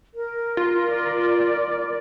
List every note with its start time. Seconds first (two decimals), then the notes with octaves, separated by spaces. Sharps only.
0.13 A#4
0.57 F4
0.92 D5